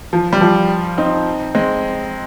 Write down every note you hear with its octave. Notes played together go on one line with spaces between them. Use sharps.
F3
G3
F3
C4 D#4
G#3 C4